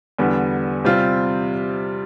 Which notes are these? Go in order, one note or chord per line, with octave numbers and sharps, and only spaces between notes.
E2 D3 G3 B3
C3 G3 C4 F4